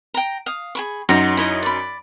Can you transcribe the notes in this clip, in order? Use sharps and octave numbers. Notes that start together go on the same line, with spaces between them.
G5 A#5
F5 D#6
G#4 B5 C#6
F#2 D#4 F#4 C#5 C6
E4 C#5 D#5
D5 B5